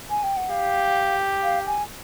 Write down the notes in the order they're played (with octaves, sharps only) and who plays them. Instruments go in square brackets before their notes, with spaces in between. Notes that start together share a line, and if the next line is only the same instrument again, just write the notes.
[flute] G#5
G5
F#5
[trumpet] G4 [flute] F5
[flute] F5
G#5